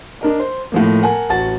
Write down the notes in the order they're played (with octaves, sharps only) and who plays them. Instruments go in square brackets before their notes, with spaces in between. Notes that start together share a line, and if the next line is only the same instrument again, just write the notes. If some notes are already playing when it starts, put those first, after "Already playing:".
[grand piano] D4 A#4 D#5
C5
A2 F3 A#3
A#4 F#5 G#5 A5
A1 F#4 F#5 A5 A6